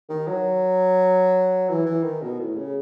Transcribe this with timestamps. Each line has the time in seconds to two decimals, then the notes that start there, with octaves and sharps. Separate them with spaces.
0.09 D#3
0.27 F#3
1.69 E3
1.86 E3
2.04 D#3
2.22 B2
2.39 A2
2.56 C#3